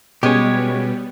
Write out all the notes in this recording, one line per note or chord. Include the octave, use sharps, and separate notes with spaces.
B2 G3 G#3 B3 C#4 G4 C#5